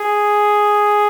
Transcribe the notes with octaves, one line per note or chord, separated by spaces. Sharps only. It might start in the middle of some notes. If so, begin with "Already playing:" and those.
Already playing: G#4